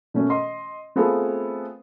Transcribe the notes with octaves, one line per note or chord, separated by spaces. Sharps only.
B2 A3 C#4
D#5 C6
A3 B3 C4 F4 G#4 A4